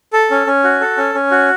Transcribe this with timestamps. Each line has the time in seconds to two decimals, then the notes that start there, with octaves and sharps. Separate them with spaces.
0.13 A4
0.31 C#4
0.47 C#4
0.64 F#4
0.81 A4
0.97 C#4
1.15 C#4
1.31 F#4